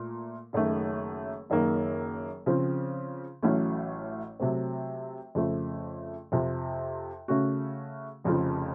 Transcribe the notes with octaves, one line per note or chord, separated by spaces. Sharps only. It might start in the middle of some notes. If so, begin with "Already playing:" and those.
Already playing: A#2 A3 A#4
F#1 F#2 D#3 A3
F#1 F#2 D#3 A#3
C#3 F3 C4
A1 A2 F#3 A3 C#4
C3 F#3 A3 C4
F2 C#3 F3 A3
F2 C3 F3
C#3 A3 C#4 F#4
F1 F2 C#3 F3